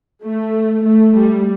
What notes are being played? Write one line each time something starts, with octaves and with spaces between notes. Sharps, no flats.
A3
A3
G3